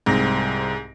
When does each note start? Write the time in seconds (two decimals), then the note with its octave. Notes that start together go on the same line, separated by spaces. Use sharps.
0.06 C2 G#2 C4 A#6